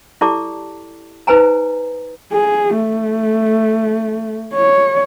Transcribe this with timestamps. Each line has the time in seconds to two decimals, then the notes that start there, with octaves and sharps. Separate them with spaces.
0.21 E4 G4 A4 D5 A5 D6
1.27 D#4 B4 C5 G#5 A#5
2.33 G#4
2.76 A3
4.55 C#5